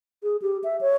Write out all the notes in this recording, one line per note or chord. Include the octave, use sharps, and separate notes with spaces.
G#4
G4
E5
C#5